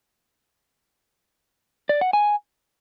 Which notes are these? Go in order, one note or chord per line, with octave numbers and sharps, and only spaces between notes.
D5
F#5
G#5